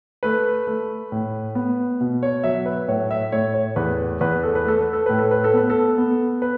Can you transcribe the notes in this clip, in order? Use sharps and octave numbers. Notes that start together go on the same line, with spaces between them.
A3 B4
A3
A2
B3
B2
C#5
F#3 E5
B4
A2 C#5
E5
A2 C#5
C#5
E2 B4
E2 B4
A4
B4
A3 A4
B4
A4
A2 B4
A4
B4
A4
B3 B4
A4
B3
B4